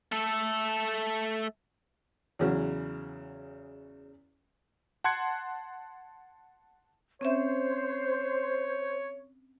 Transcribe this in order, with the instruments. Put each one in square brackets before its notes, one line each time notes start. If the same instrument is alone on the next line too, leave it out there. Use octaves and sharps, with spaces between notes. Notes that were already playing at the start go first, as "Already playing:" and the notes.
[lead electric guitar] A3 A4
[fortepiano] E2 C#3 F#3
[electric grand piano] F#5 A5 C6 F#6 G#6 C#7
[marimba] C4 C#4 E5 [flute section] C5 [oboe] C#5